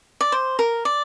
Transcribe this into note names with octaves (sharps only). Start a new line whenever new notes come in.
D5
C5
A#4
D5